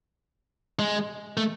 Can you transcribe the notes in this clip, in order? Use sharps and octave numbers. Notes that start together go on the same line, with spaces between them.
G#3
A3